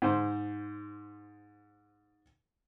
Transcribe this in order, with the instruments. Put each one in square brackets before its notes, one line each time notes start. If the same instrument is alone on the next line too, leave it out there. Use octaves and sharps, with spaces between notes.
[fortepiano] G#2 C5